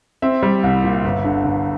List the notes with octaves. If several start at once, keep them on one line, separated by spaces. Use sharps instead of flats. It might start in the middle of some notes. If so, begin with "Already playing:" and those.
C4 E5
G3
C2
A#2
G1
D3
G1